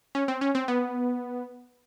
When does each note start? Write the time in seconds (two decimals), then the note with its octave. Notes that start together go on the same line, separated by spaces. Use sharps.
0.15 C#4
0.28 C4
0.41 C#4
0.55 C4
0.68 B3